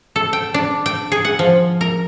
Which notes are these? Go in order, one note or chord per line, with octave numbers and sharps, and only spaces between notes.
A4
G5
D4
G5
G#4
F#5
F3
A#4